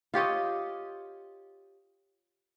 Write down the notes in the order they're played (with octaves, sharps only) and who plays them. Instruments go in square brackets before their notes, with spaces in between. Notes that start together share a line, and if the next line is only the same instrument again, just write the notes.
[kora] F4 G4 C#5 D#5